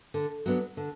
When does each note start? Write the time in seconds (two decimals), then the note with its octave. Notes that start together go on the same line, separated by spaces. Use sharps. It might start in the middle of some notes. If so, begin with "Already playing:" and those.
0.14 D3
0.46 F#3 B3 D4
0.77 D3